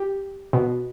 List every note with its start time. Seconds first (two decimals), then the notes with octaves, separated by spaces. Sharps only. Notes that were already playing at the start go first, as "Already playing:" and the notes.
Already playing: G4
0.53 B2